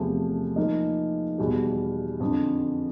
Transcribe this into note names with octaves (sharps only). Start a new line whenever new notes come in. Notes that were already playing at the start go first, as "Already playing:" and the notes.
Already playing: E2 C3 F3 A3
F3 A#3 D#4
E2 B2 G3
F2 D3 F3